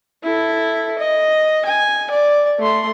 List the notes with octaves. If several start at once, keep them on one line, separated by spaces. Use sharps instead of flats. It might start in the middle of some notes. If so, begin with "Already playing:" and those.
E4 A4
D#5
G#5
D5
A3 C6